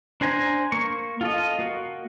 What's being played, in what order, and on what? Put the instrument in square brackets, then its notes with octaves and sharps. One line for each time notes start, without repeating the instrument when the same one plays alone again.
[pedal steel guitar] D4 C5 G#5 A#5
A#3 C#6
F4 A4 D#5
A#3 F#4